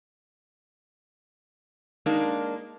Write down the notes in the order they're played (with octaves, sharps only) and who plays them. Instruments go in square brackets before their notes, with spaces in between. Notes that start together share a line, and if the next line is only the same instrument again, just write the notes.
[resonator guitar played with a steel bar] G#3 A#3 D4 D#4